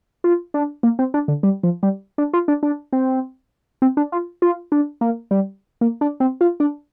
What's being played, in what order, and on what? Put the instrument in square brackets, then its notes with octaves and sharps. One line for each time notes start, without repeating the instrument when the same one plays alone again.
[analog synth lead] F4
D4
A#3
C4
D4
D3
G3
F3
G3
D4
F4
D4
D4
C4
C4
D4
F4
F4
D4
A#3
G3
A#3
D4
C4
F4
D4